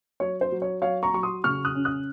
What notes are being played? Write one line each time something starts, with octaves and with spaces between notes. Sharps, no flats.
F#3 C#5
C5
F#3
C#5
F#3 C#5 F5
A#5 C#6
F#3 C#6
C6 D#6
C#3 C#6 F6
D#6 F#6
C#4
D#6 F#6